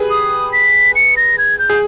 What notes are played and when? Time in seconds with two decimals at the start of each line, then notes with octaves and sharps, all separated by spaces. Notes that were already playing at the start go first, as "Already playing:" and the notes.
Already playing: G4 G#4 B4
0.10 D#6
0.53 B6
0.96 C#7
1.17 A#6
1.38 G#6
1.59 G6
1.70 G#4